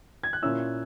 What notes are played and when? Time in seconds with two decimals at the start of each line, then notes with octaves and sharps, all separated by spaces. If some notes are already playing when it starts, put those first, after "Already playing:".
0.23 G#6
0.33 F#6
0.42 A#2 A#3 C#4 E4 E6